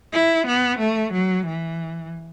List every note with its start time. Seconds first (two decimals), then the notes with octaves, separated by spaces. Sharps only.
0.14 E4
0.47 B3
0.79 A3
1.13 F#3
1.46 E3